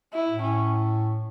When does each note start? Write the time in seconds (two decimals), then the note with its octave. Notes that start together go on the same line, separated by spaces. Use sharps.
0.13 E4
0.28 A2
0.41 C#4